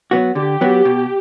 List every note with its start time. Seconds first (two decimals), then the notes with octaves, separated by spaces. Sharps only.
0.11 F#3 B3 F#4
0.35 D3 G4
0.61 F#3 B3 F#4
0.85 B2